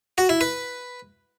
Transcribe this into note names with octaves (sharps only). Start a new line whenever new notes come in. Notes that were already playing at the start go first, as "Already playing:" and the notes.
F#4
E4
B4